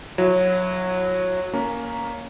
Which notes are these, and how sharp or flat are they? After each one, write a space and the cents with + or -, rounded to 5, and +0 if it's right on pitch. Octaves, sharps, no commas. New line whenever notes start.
F#3 -15 E4 +20
A#3 +5 C#4 +15 A#5 +0